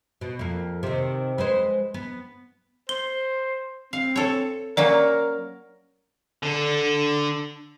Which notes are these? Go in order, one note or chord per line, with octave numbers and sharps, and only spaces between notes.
B2
F2 A#3
C3 D#3
G#3 B4 C5
B3
C5 G7
C4 F5
A4 C#5
F#3 A#3 C#4 A#4 D5
D3 A4